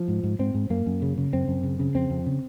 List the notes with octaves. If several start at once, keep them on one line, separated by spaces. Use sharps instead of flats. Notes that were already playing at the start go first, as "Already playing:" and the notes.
Already playing: F3
G#2
G#2
G#2 C4
G#2
F#2 A#3
F#2
C#3
C#3
F#2 C4
F#2
C#3
C#3
F2 C4
F2
C#3